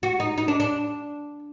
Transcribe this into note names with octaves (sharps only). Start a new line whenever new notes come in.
F#4
D#4
D#4
D4
D4